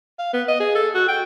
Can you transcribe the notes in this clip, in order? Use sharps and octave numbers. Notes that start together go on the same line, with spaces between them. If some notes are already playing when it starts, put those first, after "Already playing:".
F5
B3
D#5
G#4
A4
F#4
G5